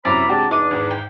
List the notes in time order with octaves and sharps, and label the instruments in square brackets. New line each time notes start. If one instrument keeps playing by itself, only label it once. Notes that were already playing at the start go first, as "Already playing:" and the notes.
[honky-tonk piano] F#2 C3 [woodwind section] E4 C5 B5 [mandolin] D5 A#5
[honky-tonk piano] C3 G#3 G4 [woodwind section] D4 F#4 A5
[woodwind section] E2 D4 [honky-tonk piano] D#4 [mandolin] D6 D#6
[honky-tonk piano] G#1 G#2
[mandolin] G5